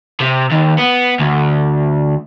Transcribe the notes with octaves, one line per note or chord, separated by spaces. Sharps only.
C3
D#2
B3
D2